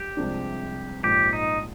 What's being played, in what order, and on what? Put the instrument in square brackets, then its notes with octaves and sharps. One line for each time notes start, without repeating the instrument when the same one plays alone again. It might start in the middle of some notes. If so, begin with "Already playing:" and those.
Already playing: [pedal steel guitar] G4
[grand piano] C2 C3 F3 G#3 D4
[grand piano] A#1 G#2 F3 [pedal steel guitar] G4
[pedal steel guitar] D#4